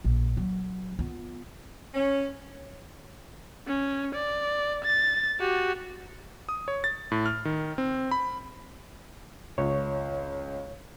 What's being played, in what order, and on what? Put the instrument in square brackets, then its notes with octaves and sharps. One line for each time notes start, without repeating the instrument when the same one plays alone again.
[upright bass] A#1
F#3
B3 F4
[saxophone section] C#4
[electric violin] C#4
D5
A6
F#4 G4
[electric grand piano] D#6
C#5
A6
A2
F6
D#3
C4
B5
[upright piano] C#2 [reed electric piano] C#5